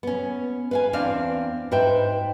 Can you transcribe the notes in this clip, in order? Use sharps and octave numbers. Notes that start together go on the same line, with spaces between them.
B3 C#4
B4 F5 G#5
E2 C4 D4 D5 F5
G#2 B4 C5 E5 G5